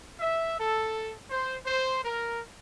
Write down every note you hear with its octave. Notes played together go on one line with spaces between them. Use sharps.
E5
A4
C5
C5
A#4